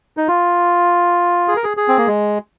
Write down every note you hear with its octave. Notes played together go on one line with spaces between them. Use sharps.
D#4
F4
G#4
A#4
G#4
G#4
C4
A#3
G#3